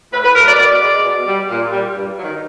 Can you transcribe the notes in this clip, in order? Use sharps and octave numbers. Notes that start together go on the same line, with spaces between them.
A2 B4
B4
F#3 A3 A#4
D5
B2 D5
G#3
B2
G3
A#2
G3
G2
F#3
D#3